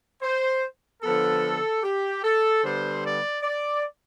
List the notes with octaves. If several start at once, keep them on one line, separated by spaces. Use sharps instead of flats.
C5
D3 F3 B3 A4
G4
A4
D3 G3 B3 C5
D5
D5